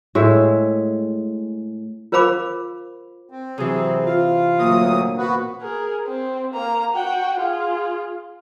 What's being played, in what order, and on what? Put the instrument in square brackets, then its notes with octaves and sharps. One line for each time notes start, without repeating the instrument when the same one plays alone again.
[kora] A2 G#3 G#4 E5
[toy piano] F4 A#4 C5 F5 B5 D6
[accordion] C4
[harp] C3 E3 [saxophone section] F#3 G#4
[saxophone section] F4
[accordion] D2 F#3 D#6 [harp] A#2
[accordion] B3 F#4 B4
[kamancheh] G#4 A#4
C4
A#3 A#5
F#4 G5
F4 G#4